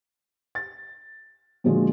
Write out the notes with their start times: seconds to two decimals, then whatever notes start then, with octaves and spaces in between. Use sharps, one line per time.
0.55 A6
1.64 A#2 D3 F3 G#3 F4 F#4